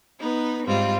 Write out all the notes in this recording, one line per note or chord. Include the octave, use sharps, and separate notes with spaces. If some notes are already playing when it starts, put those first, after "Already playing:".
B3 D#4 B4
G#2 G3 C4 F4